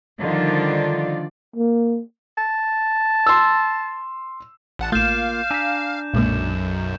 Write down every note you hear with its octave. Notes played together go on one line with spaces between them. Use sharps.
D3 D#3 F3 G3 F4 D5
A#3
A5
C6 E6
A1 F#5 A5
A1 A3 A#3 F4 F5 G6 E7
D4 G#5 A#5 E6 B6
B1 F#2 A#2 G#3 A#3